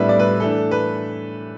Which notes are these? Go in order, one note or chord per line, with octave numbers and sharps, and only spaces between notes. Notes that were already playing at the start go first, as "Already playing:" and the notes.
Already playing: A2 G3 B3 D4 B4 E5
D5
B4
E3 A3 D4 A4
B4